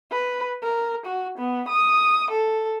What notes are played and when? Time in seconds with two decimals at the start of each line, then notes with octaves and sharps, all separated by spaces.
0.11 B4
0.63 A#4
1.06 F#4
1.38 B3
1.68 D#6
2.31 A4